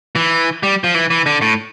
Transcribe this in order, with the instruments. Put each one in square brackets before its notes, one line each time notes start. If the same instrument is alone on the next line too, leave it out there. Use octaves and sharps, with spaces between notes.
[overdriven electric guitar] E3
G3
F3
E3
E3
D3
A2